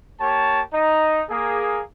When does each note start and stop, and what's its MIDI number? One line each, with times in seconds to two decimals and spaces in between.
0.20 0.61 58
0.20 0.61 67
0.20 0.61 73
0.20 0.61 81
0.73 1.22 63
1.29 1.81 58
1.29 1.81 68